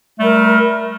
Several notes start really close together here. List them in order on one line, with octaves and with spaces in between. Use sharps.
A3 G3 A#4